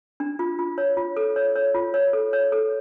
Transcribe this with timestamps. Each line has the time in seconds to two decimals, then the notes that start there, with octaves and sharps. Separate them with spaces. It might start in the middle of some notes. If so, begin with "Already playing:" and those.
0.20 D4
0.39 F4
0.59 F4
0.78 C#5
0.97 F4
1.17 A4
1.36 C#5
1.56 C#5
1.75 F4
1.94 C#5
2.13 A4
2.33 C#5
2.52 A4